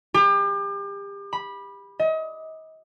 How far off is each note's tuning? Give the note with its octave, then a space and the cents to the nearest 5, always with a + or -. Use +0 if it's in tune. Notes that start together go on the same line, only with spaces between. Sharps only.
G4 +35
B5 -10
D#5 +35